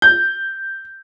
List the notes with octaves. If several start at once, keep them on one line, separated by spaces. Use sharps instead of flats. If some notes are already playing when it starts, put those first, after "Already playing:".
G6